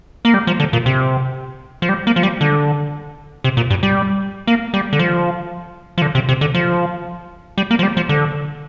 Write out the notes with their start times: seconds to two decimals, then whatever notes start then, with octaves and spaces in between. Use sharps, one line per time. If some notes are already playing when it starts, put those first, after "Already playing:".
0.25 A#3
0.34 G3
0.47 F3
0.60 D3
0.73 A#2
0.86 C3
1.82 F3
1.89 G3
2.07 A#3
2.16 F3
2.23 G3
2.41 D3
3.44 C3
3.57 A#2
3.70 G2
3.83 G3
4.47 A#3
4.74 G3
4.93 D3
4.99 F3
5.98 F3
6.02 D3
6.15 C3
6.29 C3
6.41 D3
6.54 F3
7.58 G3
7.71 A#3
7.79 F3
7.83 G3
7.97 F3
8.09 D3